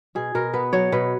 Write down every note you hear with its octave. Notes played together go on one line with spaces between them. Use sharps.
B2 G#4
B2 A#4
B3 B4
F#3 C#5
B2 B4